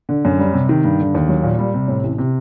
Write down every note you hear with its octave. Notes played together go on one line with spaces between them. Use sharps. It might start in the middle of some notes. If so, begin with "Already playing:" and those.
D3
F#2
G3
C3
D#3
G2
D3
D#2
F#3
A#2
G3
C3
A2
A1
C3